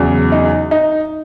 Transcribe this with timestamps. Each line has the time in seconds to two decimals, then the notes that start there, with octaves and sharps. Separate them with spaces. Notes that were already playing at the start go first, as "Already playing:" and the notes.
Already playing: E2 C#3 F#3
0.32 D#4
0.71 D#4